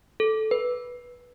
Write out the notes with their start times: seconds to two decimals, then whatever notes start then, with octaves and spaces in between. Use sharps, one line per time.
0.20 A4
0.51 B4